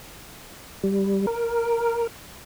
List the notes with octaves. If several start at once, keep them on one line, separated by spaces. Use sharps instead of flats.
G3
A#4